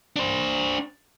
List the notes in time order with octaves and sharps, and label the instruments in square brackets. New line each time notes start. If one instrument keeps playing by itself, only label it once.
[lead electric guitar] D4 C5